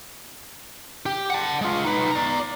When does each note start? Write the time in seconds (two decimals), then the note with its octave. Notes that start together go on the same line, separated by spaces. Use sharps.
1.06 G4 G5
1.30 F#5 A5
1.61 G#3 F4
1.85 D#4 B4
2.11 D5 A#5